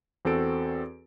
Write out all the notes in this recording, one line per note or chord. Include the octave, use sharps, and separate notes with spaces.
E2 C4 F#4 A4 D7